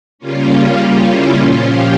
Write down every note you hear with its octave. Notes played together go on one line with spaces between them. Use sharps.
C#3 G3 A#3 C#4 F4
E4
A#2 F3 C#4 F4
G4